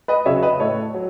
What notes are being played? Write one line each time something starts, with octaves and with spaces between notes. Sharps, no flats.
B4 D#5
C#3 F#3 C#5 E5
B4 D#5
A2 A4 C#5
F#3